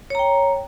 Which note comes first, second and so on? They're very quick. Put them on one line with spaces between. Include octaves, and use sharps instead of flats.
C#5 A#5 G5